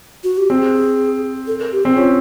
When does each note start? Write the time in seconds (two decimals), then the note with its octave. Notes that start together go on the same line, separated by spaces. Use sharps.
0.24 F#4
0.37 G4
0.50 C4 G#4
1.47 A4
1.60 A#4
1.72 G4
1.84 C4 G#4
1.96 C#4 F4